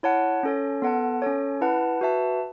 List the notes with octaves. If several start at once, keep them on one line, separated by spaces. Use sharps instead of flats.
E4 C#5 F#5 A5
C#4 A4 C#5
B3 A4 F#5 A5
C#4 A4 C#5
E4 B4 F#5 A5
F#4 B4 E5 A5